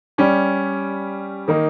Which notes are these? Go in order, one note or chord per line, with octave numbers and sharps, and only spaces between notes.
G3 C#4 G4
D#3 A#3 D#4